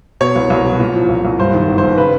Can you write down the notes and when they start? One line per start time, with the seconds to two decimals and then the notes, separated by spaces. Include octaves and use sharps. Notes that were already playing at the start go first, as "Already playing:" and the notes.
0.20 B2 C#5
0.36 C2
0.50 C2
0.65 B2
0.80 A#2
0.94 F3
1.09 C2
1.25 C2
1.38 G2 C5
1.54 D#3
1.68 G1
1.78 C5
1.83 G1
1.98 C#3 B4